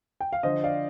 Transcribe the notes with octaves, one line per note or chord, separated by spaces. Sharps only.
G5
F5
D3 F3 C5 D#5
D5 F5